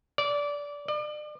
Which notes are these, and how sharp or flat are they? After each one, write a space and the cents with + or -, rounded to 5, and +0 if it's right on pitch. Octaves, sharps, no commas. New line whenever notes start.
D5 -20
D5 +35